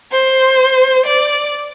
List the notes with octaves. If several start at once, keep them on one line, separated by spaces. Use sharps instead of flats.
C5
D5